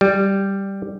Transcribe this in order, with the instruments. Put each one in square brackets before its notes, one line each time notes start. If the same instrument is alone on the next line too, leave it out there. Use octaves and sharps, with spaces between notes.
[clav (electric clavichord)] G3